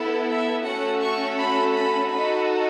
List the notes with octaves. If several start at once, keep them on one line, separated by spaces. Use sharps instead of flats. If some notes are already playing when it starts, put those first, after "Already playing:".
Already playing: B3 E4 A4
E5
A3 C#4 F#4 A4 F#5
C#6
B5
B5
D#4 F#4 A4 B5